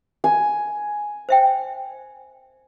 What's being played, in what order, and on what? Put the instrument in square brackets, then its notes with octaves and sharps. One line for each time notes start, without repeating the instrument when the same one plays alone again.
[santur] G#5
[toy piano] C5 E5 G5